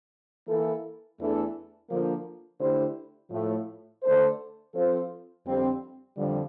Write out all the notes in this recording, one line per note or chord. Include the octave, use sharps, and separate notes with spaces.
E3 A#3 E4 A4
E2 E3 A3 D4 A4
D3 F3 A#3
D3 A3 E4 G4 C5
A2 F3 A3
D3 A3 D4 A4 C5
F3 C4 F4 A4 C5
F2 D3 G3 C4 G4
F2 D3 G3